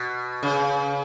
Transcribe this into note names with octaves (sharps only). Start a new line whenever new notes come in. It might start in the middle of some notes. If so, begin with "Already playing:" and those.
Already playing: B2
C#3